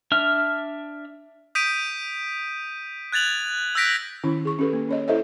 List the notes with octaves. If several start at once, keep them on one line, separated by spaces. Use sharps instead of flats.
D4 E5 F6
D#6 G6 B6 D7 D#7
F#6 G#6 A6 F7 F#7
E6 F#6 G6 A#6 B6 D7
D#3 C#4 E4
G#4 C#6
C#4 G4 A4 B4
A#3
C#4 C#5 D#5
E4 A4 C5 D#5 E5